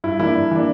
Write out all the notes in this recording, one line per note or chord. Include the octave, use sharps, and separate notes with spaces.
G2 E4
E3 A#3 D4 E4
G2
E3 A#3 D4